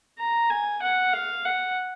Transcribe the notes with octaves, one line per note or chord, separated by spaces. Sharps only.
A#5
G#5
F#5
F5
F#5